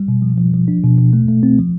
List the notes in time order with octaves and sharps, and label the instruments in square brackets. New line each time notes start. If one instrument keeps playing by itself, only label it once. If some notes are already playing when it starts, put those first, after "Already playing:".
Already playing: [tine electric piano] G3
B2
F3
F3
F3
D4
B2
B2
A3
A3
C4
F3